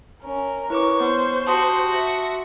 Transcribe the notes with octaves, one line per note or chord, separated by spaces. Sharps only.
C#4 A#4
E4 B4 C#5 C#6 D6
B3 C5
F#4 G4 A5 C6 D#6
E5